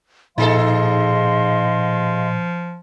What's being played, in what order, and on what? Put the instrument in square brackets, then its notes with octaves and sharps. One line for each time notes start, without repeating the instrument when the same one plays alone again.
[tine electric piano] A#2 [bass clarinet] F3 [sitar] D#4 G#4 A4 [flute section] D#5 F5 C6